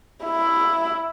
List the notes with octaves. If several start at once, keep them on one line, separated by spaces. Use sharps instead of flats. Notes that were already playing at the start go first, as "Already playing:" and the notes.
E4